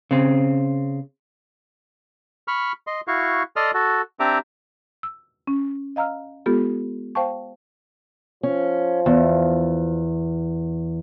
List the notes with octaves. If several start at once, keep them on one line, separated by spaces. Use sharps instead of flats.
C#3 C4
B5 C#6 F6
D#5 C6
E4 F#4 F5 C#6
A4 D5 D#5 C6 D#6 F6
F#4 A4
C4 D4 G4 E5 A#5 D6
E6
C#4
D#5 F5 A#5 E6 F6
G#3 B3 F4 G4 A4
C5 F5 G5 A5 C#6
F3 C#4
E2